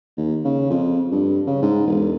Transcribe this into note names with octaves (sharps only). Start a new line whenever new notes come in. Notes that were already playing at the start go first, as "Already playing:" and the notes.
D#2
C#3
F2
G2
C#3
G#2
E1